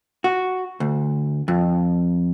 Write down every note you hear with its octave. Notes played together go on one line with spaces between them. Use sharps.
F#4
D2
F2